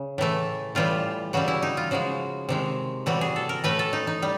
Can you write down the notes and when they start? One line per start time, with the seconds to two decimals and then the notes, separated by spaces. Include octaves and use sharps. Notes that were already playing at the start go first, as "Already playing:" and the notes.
Already playing: C#3
0.18 A2 E3 A3
0.75 A2 E3 G3 F4
1.33 C#3 E3 G3 F#4
1.48 E4
1.62 D#4
1.77 F4
1.91 C#3 F3 G#3 F#4
2.49 C3 D#3 G#3
3.06 A2 E3 G3 F#4
3.21 G#4
3.36 A4
3.49 A#4
3.64 A2 E3 A3 B4
3.79 A4
3.93 D#4
4.07 D#4
4.22 G3